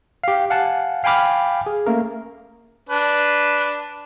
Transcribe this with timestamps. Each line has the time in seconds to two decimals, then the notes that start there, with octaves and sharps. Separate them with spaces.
0.24 G4 F5
0.50 F5 F#5 G#5 A5
1.04 F5 G5 G#5 B5 D6 F6
1.66 G#4
1.86 A3 A#3 C#4 A#4
2.89 D4 B4